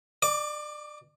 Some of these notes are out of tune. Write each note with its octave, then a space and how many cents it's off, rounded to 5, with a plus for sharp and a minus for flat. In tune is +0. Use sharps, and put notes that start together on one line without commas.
D5 +30 D6 -15